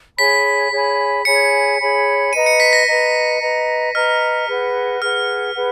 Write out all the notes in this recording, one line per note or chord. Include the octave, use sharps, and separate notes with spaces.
G#4 C#5 G#5 B5 B6
G#4 C#5 G#5 B5
G#4 C#5 G#5 B5 C#7
G#4 C#5 G#5 B5
B4 D#5 A#5 D#7
C#7
B6
A#6
B4 D#5 A#5
B4 D#5 A#5
B4 D#5 A#5 F6
G#4 B4 F#5
G#4 B4 F#5 F6
G#4 B4 F#5